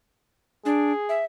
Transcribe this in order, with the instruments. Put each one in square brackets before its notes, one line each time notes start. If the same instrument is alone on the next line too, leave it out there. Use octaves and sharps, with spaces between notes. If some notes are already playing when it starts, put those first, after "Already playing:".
[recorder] D4 [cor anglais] G#4
[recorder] E5